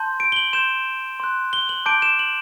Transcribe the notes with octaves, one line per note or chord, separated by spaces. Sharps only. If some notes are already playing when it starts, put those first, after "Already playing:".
Already playing: A5 C6 G6
D7
G7
F#7
C6 G6 E7
C6 F#6
G7
F#7
A5 D6 G6 D7
E7
F#7